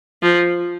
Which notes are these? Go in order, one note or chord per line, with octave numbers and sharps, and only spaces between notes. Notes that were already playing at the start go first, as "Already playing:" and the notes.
F3